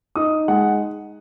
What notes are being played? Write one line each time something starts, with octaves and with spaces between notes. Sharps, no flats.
D#4 D#6
G#3 F#5